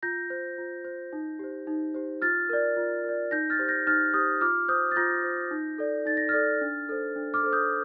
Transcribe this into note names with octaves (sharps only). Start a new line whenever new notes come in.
F4 G6 A#6
C5
F4
C5
D#4
G4 C5
D#4
G4 C5
F4 F6 A6
A#4 D5
F4
A#4 D5
D#4 G6 A#6
F6 A6
G4 C5
G6 A#6
D#4 F6 A6
G4 C5 D#6 G6
F4 D6 F6
C5 D#6 G6
A6
F4 G6 A#6
C5
D#4
A4 D5
D#4 A6
A#6
A4 D5 F6 A6
D4
A4 C5
D4
D6 F6
A4 C5
D#6 G6